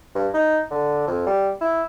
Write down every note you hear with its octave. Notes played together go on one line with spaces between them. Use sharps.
G2
D#4
D3
F2
G3
E4